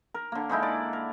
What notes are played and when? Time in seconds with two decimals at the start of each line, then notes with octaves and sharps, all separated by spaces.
0.14 A#4
0.32 D3 A#3
0.49 D3 G#3 D#4 E4
0.63 D5
0.93 A#4